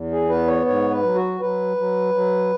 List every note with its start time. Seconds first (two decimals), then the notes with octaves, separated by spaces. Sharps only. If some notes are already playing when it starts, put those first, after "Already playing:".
Already playing: E2
0.11 G#4
0.29 B3 B4
0.47 C#5
0.66 G#2 C#5
0.91 B4
1.03 F#3
1.15 F#4
1.41 F#3 B4
1.77 F#3
2.14 F#3